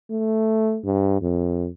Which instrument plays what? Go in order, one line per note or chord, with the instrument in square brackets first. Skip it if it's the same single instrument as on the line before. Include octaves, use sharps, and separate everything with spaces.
[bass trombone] A3
G2
F2